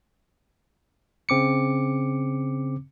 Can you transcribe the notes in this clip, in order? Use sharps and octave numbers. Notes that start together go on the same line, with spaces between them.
C#3 C4 D6 C#7